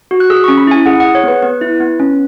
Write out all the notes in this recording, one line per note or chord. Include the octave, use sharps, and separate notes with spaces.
F#4
F#6
G#4 E6
C#4 C#6
B5
E4 G#5
G#4 F#5
G#4 F#5
C#5
B3 B4
B3 B4
E4
B3
C#4